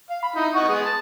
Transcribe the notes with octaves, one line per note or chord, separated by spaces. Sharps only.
F5
B5
D#4 E4
D#5 F#5 C#6
G#3 B3 G#4
A5